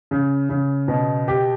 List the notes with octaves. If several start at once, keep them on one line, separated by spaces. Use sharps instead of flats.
C#3
C#3
B2
G4